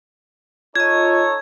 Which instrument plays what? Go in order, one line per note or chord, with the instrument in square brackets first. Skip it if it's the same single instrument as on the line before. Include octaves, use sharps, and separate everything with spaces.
[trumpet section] D#4 A4 C#5 [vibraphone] F4 D#5 [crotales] G#6